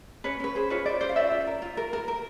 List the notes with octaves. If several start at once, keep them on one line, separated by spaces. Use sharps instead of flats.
C#4 B4 C#5
C#4 B4
G#4 C5
F4 B4 C#5
C#4 C5 D5
F4 C5 D5
F5
C#4 D5 E5
F4
A#4
F4
A#4
A#4
A#4